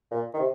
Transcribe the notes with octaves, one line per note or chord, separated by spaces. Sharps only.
A#2
D#3
C3